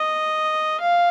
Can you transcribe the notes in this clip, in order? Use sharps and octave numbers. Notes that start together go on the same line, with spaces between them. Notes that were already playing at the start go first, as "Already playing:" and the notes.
Already playing: D#5
F5